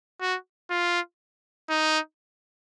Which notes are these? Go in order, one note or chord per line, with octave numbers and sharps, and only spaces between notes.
F#4
F4
D#4